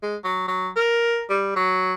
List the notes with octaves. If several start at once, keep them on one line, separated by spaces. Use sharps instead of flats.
G#3
F#3
F#3
A#4
G3
F#3